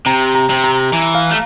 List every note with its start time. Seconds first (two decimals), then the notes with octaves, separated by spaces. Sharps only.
0.06 C3 A#5
0.35 A#5
0.50 C3
0.64 A#5
0.93 E3
1.15 F5
1.31 A3